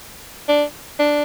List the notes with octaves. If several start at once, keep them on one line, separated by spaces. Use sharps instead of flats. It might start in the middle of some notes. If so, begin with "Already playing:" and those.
D4
D4